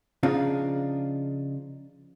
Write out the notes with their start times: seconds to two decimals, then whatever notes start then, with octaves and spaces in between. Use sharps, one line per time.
0.23 C#3 F3 D4 D#4 F4